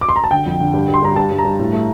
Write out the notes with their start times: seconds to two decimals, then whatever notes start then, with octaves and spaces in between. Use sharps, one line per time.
0.01 D6
0.09 C6
0.16 A#5
0.24 A5
0.31 D3 G5
0.46 F2
0.60 D3
0.74 G2
0.88 G2
0.94 C6
1.03 G2 A#5
1.16 G2 A5
1.31 G2
1.38 A#5
1.45 G2
1.59 A2
1.73 A3